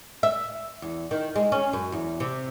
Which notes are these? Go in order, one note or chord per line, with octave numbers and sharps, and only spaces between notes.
E5
E2
D#3
G#3
C#4
F#2
E2
C3